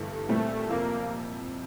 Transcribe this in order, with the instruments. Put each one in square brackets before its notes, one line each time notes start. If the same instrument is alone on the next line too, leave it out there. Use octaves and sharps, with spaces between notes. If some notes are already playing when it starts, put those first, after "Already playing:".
Already playing: [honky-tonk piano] G1 G2 E3 A3
[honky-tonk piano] A#2 G3 C4 E4 [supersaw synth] A3
[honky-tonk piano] F2 C3 F3 [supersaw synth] A#3